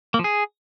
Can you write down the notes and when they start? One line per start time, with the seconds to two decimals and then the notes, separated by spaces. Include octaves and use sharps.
0.14 A#3
0.19 F3
0.24 G#4